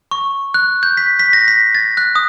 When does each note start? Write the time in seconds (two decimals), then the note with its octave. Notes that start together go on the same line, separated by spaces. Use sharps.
0.11 C#6
0.54 F#6
0.83 G6
0.97 B6
1.19 B6
1.33 A#6
1.48 B6
1.75 A6
1.97 F#6
2.15 D#6